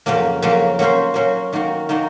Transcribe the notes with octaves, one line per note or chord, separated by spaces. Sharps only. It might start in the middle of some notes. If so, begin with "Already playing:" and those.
F2 C#3 F#3 A#3
F2 C#3 F#3 A#3
F#3 A#3 C#4 F#4 C5
F#3 A#3 C#4 F#4 C5
D#3 A#3 D#4 F#4
D#3 A#3 D#4 F#4